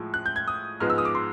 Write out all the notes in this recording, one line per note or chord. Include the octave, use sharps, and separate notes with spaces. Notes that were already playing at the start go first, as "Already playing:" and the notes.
Already playing: A2 F3 G#3
F#6
G6
G#6
D#6
G#2 F3 G#3 B3 F6
E6
D#6
D6
C6